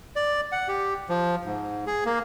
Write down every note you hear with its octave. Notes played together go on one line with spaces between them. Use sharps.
D5
F#5
G4
F3
G#2
G#4
A#3